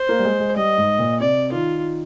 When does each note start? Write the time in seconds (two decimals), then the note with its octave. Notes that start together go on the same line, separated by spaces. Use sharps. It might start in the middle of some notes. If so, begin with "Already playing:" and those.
Already playing: C5
0.09 A#3
0.19 G3
0.25 G#3
0.40 G#3
0.56 G3 D#5
0.78 G#2
0.99 A#2
1.20 C3 D5
1.52 D#3 F4